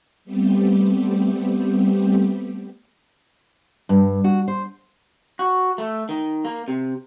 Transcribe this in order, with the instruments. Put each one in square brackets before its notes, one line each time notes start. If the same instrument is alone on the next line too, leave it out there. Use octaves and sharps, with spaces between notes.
[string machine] G3 A3 B3 C4 G4
[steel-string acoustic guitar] G2
F#4
C5
[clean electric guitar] F#4
A3
D#3
A#3
C3